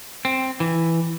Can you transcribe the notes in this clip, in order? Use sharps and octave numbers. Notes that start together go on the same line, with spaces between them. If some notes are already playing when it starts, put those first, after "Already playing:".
C4
E3